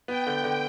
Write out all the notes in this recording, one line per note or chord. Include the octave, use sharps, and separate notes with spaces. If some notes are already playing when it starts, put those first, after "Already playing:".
B3 G5
D3
D3